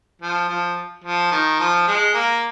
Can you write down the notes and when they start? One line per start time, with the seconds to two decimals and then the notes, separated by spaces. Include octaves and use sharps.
0.22 F3
0.49 F3
1.04 F3
1.32 D#3
1.59 F3
1.87 G#3
2.14 A#3